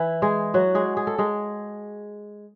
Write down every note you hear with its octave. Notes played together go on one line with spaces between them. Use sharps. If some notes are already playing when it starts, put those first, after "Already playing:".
Already playing: E3 E4
G#3 G#4
F#3 F#4
G#3 G#4
G#4
A4
G#3 G#4